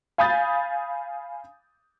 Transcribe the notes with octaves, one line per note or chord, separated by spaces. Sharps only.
F5 G#5 B5 D#6 G6 A6